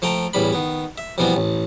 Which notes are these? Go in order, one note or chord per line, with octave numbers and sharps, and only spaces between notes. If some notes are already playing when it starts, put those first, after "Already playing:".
F3 A3 G5 A#5
A1 E2 G3 B5
D#3 B3
E5
F2 B2 E3 G3 B3 C4
A1